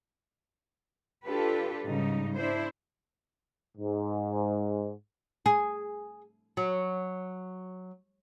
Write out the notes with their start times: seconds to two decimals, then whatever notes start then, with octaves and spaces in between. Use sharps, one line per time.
1.25 D4 F4 G4 A4 B4
1.86 G#2 C#3 G3 D#4
2.34 D4 E4 C5
3.77 G#2
5.46 G#4
6.57 F#3